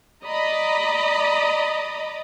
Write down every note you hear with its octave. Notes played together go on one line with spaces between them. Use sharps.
D5 D#5 A#5 B5